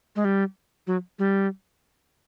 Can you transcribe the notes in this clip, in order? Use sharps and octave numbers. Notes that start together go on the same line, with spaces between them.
G#3
G3
F#3
G3